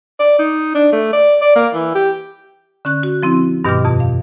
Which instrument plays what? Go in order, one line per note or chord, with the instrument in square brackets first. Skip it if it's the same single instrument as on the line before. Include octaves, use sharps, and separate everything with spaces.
[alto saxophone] D5
D#4
D4
A3
D5
D5
A#3
E3
G4
[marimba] D3 C#4 F#6
F#4
F3 C4 E4
G2 B2 D#3 G3 D6 F6
F2 B2
F5